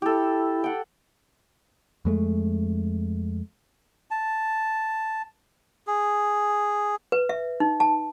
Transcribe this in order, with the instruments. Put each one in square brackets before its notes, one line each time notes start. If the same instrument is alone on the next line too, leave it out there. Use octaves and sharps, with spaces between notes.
[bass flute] E4 [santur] G4 A4
[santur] F#5 G5
[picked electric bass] F2 G#3 A3
[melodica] A5
G#4
[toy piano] B4
E5
D#4
A5